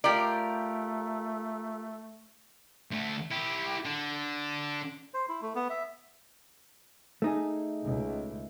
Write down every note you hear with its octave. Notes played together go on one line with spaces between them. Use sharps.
A3 F4 G4 A#4 D5
D2 A3
E4 G4
D3
C5
E4
A3
B3
E5
A3 D#4 G#4
C#2